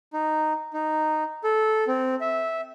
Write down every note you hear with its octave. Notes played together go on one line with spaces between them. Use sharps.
D#4
D#4
A4
C4
E5